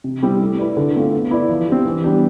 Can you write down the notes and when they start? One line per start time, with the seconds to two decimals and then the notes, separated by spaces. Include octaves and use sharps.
0.04 C3
0.23 G3 C4 E4 G4
0.41 A3
0.58 E4 B4 D5
0.77 D3
0.95 A3 C4 F4
1.13 B3
1.31 E4 B4 D5
1.49 F3
1.68 C4 G4
1.85 E3
2.04 G3 B3 D4 G4